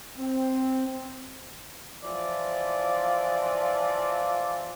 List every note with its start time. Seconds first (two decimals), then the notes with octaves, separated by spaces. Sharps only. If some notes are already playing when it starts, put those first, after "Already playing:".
0.17 C4
2.03 E3 F3 F4 D5